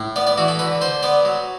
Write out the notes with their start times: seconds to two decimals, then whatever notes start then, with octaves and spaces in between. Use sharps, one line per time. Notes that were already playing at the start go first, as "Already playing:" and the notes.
Already playing: A2
0.16 B3 D5
0.27 D5
0.38 E3 F#4
0.48 A4
0.59 D3 B4
0.81 D3 C5
1.03 B3 D5
1.25 F#3